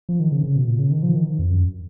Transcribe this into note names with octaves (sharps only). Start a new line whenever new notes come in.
F3
D#3
C#3
C#3
B2
A#2
C#3
D#3
F3
D#3
F2
F#2